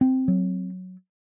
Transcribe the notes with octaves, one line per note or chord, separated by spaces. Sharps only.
C4
F#3